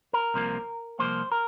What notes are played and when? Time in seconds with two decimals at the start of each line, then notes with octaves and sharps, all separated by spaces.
0.13 A#4
0.34 C2 C3 F3 A#3
0.99 C2 C3 F3 A#3 C5
1.32 A#4